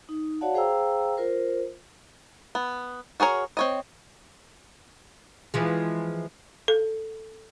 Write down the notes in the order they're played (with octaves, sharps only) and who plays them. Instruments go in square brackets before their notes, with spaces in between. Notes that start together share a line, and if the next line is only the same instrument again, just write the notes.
[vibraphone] D#4
F#4 C#5 D5 F5 F#5 A5
G#4 C5 F5 G5 A#5 E6
F4 A#4 C5
[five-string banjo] B3
F#4 G#4 A#4 C#5
C4 C#5 D#5
[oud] E3 F3 G#3
[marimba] A4